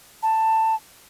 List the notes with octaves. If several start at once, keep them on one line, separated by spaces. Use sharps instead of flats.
A5